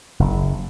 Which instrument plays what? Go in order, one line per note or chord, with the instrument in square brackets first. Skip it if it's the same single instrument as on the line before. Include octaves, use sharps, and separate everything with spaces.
[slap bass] F#1